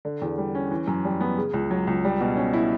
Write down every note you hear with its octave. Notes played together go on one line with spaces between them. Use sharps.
D3
E2
G3
C#4
E3
F#2
G3
B3
C#3
C#2
F#3
C#2
G3
B2
C#4
E4